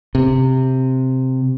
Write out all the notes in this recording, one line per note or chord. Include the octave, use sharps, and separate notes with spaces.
C3